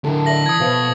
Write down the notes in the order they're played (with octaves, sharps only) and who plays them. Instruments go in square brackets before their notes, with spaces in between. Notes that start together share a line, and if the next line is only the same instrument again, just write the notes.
[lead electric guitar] D3 E4 [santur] A4 A#4
[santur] A3 D5 [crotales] A#6 F#7
[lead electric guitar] E3 [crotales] D#6 G#6
[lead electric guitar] B2 [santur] F3 B4 C5